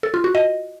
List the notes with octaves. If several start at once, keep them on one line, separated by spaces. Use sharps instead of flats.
A4
F4
F#4
D#5